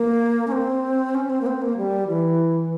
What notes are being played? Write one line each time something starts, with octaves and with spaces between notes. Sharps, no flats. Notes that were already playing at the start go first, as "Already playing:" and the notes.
Already playing: A#3
C#4
C4
C#4
C4
A#3
C4
A#3
G3
E3